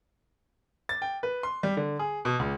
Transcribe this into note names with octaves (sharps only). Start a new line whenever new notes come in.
A6
G5
B4
C6
G3
D3
G#4
B2
C#2